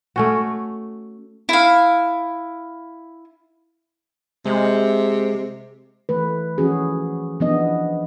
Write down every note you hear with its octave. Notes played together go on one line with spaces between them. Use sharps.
A3 C#4 F#4
E4 F5
C3 G#3
E3 A3 B4
E3 F3 C#4 F#4 G#4
E3 F3 B3 D4 D#5